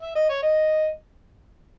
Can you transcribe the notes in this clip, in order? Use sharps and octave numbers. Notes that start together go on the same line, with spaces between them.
E5
D#5
C#5
D#5